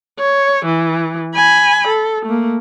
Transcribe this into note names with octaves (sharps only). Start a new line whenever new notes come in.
C#5
E3
G#5 B5
A4
A3 A#3